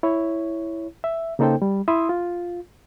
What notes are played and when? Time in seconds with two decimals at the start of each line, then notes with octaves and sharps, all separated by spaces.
0.03 E4 C#5
1.04 E5
1.39 C#3 A#3 D#4 A4 C5 G5
1.62 G3
1.88 E4 E5 C6 D#6
2.09 F4